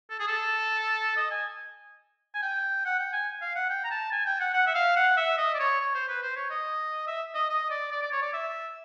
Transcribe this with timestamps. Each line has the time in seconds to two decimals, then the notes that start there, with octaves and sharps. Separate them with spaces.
0.11 A4
0.20 G#4
0.28 A4
1.17 D#5
1.31 G#5
2.34 G#5
2.42 G5
2.86 F#5
2.99 G5
3.13 G#5
3.41 F5
3.55 F#5
3.70 G5
3.84 A#5
3.91 A5
4.12 G#5
4.26 G5
4.40 F#5
4.54 F#5
4.67 E5
4.75 F5
4.96 F#5
5.17 E5
5.38 D#5
5.55 D5
5.59 C#5
5.81 C#5
5.95 C5
6.08 B4
6.23 C5
6.36 C#5
6.50 D#5
7.07 E5
7.35 D#5
7.50 D#5
7.70 D5
7.91 D5
8.02 D5
8.12 C#5
8.22 D5
8.34 E5